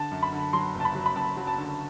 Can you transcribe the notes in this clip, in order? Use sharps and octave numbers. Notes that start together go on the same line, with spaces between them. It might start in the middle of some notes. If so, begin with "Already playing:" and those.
Already playing: D3 A5
F#2
B5
D3
F#3 C6
F#1
A5
B5
F#3
B5
F#2 A5
F#3
A5
D3